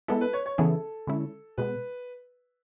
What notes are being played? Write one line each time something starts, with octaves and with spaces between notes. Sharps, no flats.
G#3 B3 E4 A4
B4
C#5
C#5
C#3 E3 B3 E4 G#4 A4
D3 G#3 C#4 E4
B2 G#3 B3 B4